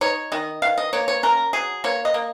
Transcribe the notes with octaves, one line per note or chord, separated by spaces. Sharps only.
D#4 C#5
D#3 D#5
D#3 F5
D#5
A#3 C#5
C#5
C#4 A#4
F#3 G#4
A#3 C#5
D#5
A#3